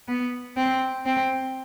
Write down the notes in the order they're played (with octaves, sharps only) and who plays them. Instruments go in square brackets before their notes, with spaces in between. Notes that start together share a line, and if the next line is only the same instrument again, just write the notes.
[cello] B3
C4
C4